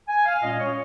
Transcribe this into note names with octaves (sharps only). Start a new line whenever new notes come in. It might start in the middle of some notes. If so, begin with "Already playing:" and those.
G#5
F5
A#2 G#3 C#4 D#5
C#5